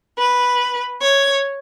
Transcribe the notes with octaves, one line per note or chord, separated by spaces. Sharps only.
B4
C#5